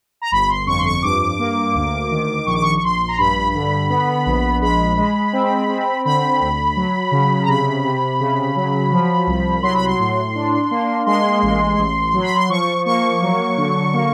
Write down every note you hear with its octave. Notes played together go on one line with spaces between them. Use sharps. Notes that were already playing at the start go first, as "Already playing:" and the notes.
A#5
G1 B5
C6
F2 C#6
C6
C#6
G2 D6
A#3
D2
D#3
A#1 C#6
D6
C#6
C#6
A#1 C6
A#5
G2 B5
D3
B3
A#1
G#3 B5
G#3
C4
C4
D3 B5
D2
F#3
C#3
A#5
C3 B5
C3
C#3
F#3
F3
C2
F#3 C6
B5
C6
A2
D4
A#3
G#3 C6
A1
A1
F#3
B5
C6
F3 C#6
A#3 C#6
F#3
D3
A#3